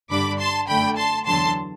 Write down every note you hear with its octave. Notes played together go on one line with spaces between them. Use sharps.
G2 D3 G3 D4 B5 D6
A5 C6
F#2 D3 A3 D4 G5 B5
A5 C6
E2 D3 F#3 A5 C6